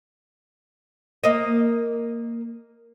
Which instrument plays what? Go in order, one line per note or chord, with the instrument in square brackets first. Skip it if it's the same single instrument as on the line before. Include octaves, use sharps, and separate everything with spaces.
[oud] A#3 D#5